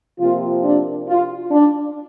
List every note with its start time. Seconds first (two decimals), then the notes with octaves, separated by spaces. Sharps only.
0.20 C3 F3 A#3 F4
0.63 D4
1.08 F4
1.51 D4